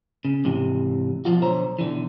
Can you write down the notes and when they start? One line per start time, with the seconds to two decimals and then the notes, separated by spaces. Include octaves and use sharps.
0.25 C#3
0.44 G#2 C3 E3
1.25 B2 F3 F4 F#4
1.41 B1 D3 C5 C#5 A#5
1.79 B2 D3 E3